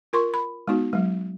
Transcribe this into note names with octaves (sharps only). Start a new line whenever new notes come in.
F4 A#4 C6 C#6
B5
G#3 B3 D#4 F#4
F#3 G#3